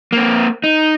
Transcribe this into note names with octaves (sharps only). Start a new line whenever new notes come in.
A#3 C4
D#4